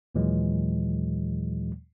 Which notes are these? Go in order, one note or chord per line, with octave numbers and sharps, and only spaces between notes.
D#2 A#2 E3 F#3 G#3